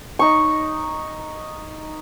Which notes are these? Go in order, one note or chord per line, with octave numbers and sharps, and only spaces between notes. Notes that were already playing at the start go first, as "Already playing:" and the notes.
D#4 C#6